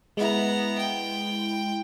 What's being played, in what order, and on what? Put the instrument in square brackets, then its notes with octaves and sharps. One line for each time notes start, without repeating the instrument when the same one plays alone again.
[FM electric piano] G#3 E4 [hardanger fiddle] B3 A#5
[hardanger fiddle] G5